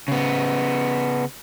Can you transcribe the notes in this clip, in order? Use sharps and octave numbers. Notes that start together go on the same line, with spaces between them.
C#3 B3